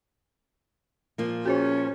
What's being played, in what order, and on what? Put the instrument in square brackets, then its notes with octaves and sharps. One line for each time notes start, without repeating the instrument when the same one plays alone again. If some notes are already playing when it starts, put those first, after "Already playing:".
[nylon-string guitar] A#2 F3 A#3
[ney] C#4 [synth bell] F#4 G#4 C5